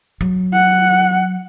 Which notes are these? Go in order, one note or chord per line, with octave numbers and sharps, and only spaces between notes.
F#3
F#5